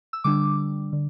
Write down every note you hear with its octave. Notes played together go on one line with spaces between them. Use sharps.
E6
D3 G3 D4 D6
D3